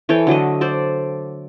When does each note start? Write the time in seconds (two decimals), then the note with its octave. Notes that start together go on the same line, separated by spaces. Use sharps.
0.09 E3 A4 C#5 G5
0.27 D3 F#3 A3 D#5
0.61 A4 C5 D5